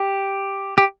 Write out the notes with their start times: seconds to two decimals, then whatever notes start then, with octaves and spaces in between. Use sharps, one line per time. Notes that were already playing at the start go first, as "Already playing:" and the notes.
Already playing: G4
0.78 G4